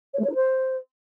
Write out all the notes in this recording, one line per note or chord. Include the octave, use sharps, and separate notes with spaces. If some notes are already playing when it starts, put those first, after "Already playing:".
C#5
A3
C#5
D#4
C5